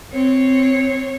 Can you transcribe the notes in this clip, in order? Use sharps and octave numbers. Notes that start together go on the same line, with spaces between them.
C4 C#5